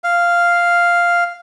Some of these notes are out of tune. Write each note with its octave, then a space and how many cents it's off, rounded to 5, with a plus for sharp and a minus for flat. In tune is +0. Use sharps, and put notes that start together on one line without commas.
F5 -5